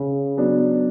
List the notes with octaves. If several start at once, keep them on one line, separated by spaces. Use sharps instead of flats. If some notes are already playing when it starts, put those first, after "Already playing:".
Already playing: C#3
F#3 B3 D4